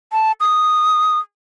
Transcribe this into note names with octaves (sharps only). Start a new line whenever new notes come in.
A5
D#6